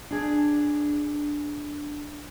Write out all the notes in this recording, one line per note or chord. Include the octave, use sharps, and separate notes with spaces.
D4 G#4